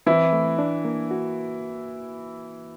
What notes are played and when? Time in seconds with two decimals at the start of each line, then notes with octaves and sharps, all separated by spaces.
0.06 E3 C4 E4
0.33 A3
0.59 D4
0.85 A#3
1.11 F#4